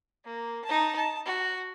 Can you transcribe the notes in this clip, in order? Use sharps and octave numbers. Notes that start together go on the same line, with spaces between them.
A#3
D#4 A5
A5
F#4